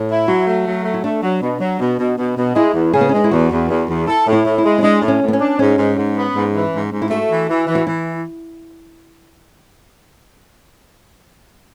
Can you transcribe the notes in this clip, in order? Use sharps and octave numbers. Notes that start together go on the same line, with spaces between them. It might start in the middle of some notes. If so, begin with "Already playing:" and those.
Already playing: A2
E4
F#3 F#4
A3
F#3
A3
E4
A3 D4
F#3
B2
F#3
B2
B2
B2
B2
G#3 E4
E2
C#3 G#4
B3
C#4
G#3 D4
E4
E2 F#4
E2
E2
E2
E4 A4
A2
E4
A2
E4
G#3
C#4
G#3 D4
A2
C#4
A2
B3
C#4
D4
G#2 C#4
G#2
G#2
B3
G#2
E3
G#2
G#2
E4
A3 F#4
E3
E3
E3
F#4
E3 E4